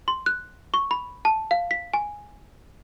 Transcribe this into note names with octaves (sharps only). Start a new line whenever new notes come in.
C6
F#6
C#6
B5
A5
F5
B6
G#5